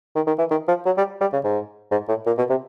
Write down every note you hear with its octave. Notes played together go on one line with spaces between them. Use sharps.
D#3
D#3
E3
D#3
F3
F#3
G3
G3
C#3
G#2
G#2
A2
A#2
B2
C3